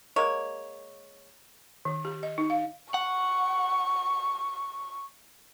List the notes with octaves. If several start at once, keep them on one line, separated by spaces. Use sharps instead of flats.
G#3 A#3 C#5
D#3
G4
D#5
D#4
F5
F#5 C#6